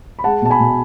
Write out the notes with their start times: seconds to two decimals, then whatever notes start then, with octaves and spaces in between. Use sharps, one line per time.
0.19 B5
0.24 G#3 F#5 A5
0.42 B2 A5
0.50 G#5 B5
0.60 B2